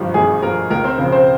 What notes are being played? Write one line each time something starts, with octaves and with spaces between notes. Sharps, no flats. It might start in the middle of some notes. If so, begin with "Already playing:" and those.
Already playing: G#1 G2 F3
G#1 G#4
G2 F3 A#4
C#2 A#4
C4 C5
C#3 F3 C4
C4 C5